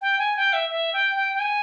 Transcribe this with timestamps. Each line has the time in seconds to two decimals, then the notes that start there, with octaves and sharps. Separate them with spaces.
0.02 G5
0.18 G#5
0.36 G5
0.53 E5
0.70 E5
0.93 G5
1.16 G5
1.34 G5
1.40 G#5